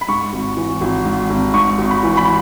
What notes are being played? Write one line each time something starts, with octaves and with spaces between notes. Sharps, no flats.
B5
G#2 C#6
G#1
E3
G#1
G#2
G#1
G#2 C#6
G#1
B5
E3
B5